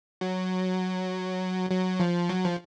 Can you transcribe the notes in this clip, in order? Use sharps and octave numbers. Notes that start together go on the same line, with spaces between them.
F#3
F#3
F3
F#3
F3